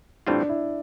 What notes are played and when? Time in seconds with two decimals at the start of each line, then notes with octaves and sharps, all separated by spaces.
0.27 A2 E3 G3 C4 D4 F4
0.49 E4